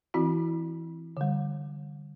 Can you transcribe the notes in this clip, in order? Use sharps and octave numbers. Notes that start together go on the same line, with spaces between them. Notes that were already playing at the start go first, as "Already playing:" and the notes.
E3 C4 E4 F#4
D3 G3